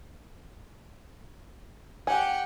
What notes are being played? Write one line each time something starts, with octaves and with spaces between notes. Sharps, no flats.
G4 F#5 G#5